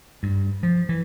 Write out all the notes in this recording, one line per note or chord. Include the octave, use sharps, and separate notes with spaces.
G2
F3
E3